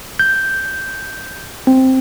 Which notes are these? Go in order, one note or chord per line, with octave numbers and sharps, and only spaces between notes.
G6
C4